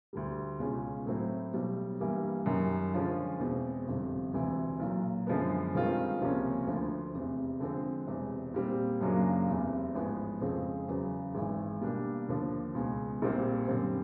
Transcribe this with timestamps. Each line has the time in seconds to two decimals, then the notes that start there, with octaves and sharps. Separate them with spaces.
0.13 D2 D3 G3
0.59 C#2 B2 G#3 C#4 F4
1.06 A2 F#3 A3 C4 E4
1.53 B1 B2 G3
2.00 G2 E3 G3 A#3
2.46 F#2 D#3 G3
2.94 D3 F3 G#3 C#4 F4
3.39 E2 B2 G#3 C4
3.87 G1 F2 C3
4.34 E1 D2 C3 E3
4.80 B1 A#2 F#3
5.27 F#2 D3 F3 G#3 B3
5.74 G2 D#3 G#3 C4 F4
6.21 C#2 C3 F3 A#3 C#4
6.67 D2 D3 F3 A3
7.15 F1 E2 C3
7.60 D3 F3 G#3 C4
8.07 E1 E2 C3
8.54 A#2 G3 C4
9.01 F#2 C#3 F#3 A#3 D4
9.48 F1 E2 C3
9.95 A1 G#2 F3 G#3 B3
10.41 F2 C#3 F3 G#3 C4
10.88 E2 C#3 F#3 B3
11.35 G#1 G#2 E3
11.81 B2 G3 A#3 D4
12.29 D#2 D3 F3
12.75 C#2 B2 G#3
13.22 A#1 A#2 G3 C4
13.68 F#2 D3 G3 C4